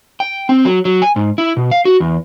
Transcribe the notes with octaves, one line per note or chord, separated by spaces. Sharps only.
G5
C4
F#3
F#3
G#5
G#2
E4
B2
F5
F#4
E2